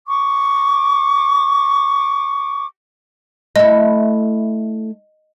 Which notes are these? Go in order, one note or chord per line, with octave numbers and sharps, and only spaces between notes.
C#6 D6
A3 E4 D#5